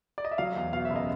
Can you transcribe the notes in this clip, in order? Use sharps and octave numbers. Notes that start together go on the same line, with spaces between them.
D5
D#5
E5
F#3 F5
E2
B2 F5
F#1 E5
D#5